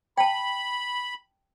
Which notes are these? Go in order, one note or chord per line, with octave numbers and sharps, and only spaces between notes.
G5 A5 B5